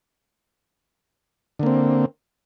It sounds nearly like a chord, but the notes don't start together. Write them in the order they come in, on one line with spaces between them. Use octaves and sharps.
D3 A#3 C4